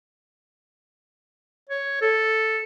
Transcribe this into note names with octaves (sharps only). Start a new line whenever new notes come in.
C#5
A4